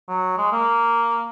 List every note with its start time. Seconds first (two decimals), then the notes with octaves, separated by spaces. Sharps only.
0.09 F#3
0.38 G#3
0.52 A#3